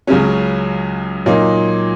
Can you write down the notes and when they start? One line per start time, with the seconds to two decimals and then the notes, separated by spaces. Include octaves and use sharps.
0.07 C#2 C#3 F#3 C#4
1.26 A#2 F#3 A#3 D#4